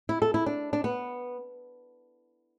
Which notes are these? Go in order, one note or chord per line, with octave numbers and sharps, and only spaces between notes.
E4
A4
E4
D4
D4
B3